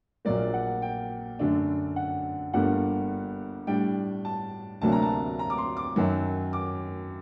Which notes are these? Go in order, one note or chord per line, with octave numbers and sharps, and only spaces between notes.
A#1 A#2 F#3 A#3 D5
F#5
G5
F#2 D3 A3 D4
F#5
G1 G2 D3 G3 A#3 F#5
A2 G3 D4 G5
A5
D2 C3 F#3 A#3 D4 A5
A#5
A5
A#5
D6
C6
D6
F#2 D#3 F#3
D6